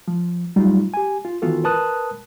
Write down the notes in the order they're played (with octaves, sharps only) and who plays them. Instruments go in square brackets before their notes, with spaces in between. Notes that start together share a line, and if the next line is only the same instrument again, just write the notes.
[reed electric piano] F3
G2 F#3 G3 A3 D#4 F4
G4 G#5
F4
D#3 E3 B3 F4 F#4 A4
A#4 B4 A5 D#6 F#6